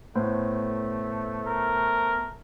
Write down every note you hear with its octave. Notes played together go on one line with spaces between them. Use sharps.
A2 A3 B3 B4 C5
A#4